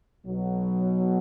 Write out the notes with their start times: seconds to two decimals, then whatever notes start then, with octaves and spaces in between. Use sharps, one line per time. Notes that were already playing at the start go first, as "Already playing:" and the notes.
0.25 B1 B2 F#3